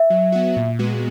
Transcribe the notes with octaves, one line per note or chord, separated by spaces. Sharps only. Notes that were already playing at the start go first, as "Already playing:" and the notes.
Already playing: E5
F#3
B3 F#4
A#2
G#3 B3 F#4